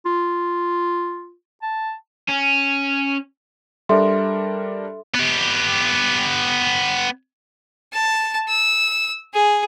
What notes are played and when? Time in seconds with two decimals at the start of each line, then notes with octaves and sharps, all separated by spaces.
0.06 F4
1.62 A5
2.28 C#4
3.89 G3 D4 A4 A#4 E5 C6
5.15 B3 G4
7.93 A5
8.48 E6
9.33 G#4